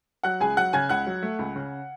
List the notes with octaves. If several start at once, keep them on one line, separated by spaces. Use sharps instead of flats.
F#3 F#5 F#6
C#2 G#4 G#5
F#3 F#5 F#6
C#3 G#5 G#6
C#2 F#5 F#6
F#3
A3
C#2
C#3